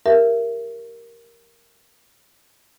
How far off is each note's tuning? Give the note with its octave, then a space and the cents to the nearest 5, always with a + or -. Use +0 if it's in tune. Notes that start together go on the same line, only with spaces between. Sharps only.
G4 +5 A#4 +0 E5 +20